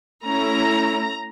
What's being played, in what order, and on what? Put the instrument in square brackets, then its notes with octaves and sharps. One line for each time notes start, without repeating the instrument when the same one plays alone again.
[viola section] A3 C#4 E4 A#5